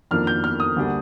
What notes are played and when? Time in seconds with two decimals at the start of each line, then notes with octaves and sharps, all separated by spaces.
0.11 F2 D#3 A#3 D4 F4 F6
0.27 G6
0.44 F6
0.60 D#6
0.76 D2 D3 G3 A#3 D4